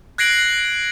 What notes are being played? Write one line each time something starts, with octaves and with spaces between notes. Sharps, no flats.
F#6 G#6 A#6 C7 D7 F#7